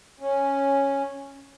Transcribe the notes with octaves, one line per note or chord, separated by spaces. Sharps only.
C#4